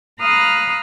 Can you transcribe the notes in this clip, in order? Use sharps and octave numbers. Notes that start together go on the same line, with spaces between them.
F5 A#5 B5 D#6 F6 F#6